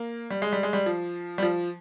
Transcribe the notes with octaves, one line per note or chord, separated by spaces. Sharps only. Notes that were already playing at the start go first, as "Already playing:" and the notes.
Already playing: A#3
G3
G#3
G3
G#3
G3
F3
G3
F3